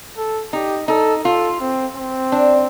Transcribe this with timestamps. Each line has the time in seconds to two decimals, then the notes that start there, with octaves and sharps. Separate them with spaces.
0.17 A4
0.53 D#4 G4
0.88 D#4 A4
1.24 F4 A4
1.61 C4
1.96 C4
2.32 D4